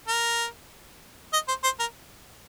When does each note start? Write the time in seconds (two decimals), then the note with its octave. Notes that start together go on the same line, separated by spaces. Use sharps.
0.08 A#4
1.33 D#5
1.48 C5
1.64 C5
1.80 A#4